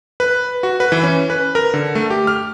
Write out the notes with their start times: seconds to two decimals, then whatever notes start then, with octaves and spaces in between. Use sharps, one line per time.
0.20 B4
0.63 F#4
0.80 B4
0.92 E3
1.03 C#4
1.30 B4
1.55 A#4
1.74 D3
1.95 A3
2.10 G4
2.27 F6